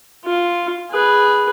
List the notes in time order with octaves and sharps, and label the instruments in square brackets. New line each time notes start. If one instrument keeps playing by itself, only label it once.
[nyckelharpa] F4
G#4 B4